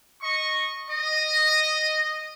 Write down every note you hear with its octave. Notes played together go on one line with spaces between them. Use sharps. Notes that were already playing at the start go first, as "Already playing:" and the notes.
D#5 C#6
D#5